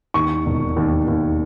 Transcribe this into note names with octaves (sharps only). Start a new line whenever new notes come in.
D#2 C#6
E1
D#2
D#2